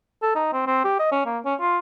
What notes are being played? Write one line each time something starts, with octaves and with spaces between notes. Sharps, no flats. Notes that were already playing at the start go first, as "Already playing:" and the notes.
A4
D#4
C4
C4
G4
D#5
C#4
A#3
C#4
F4